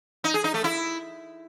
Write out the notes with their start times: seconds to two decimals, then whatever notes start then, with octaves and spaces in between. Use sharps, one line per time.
0.24 D#4
0.34 G#4
0.44 D#4
0.54 A3
0.64 E4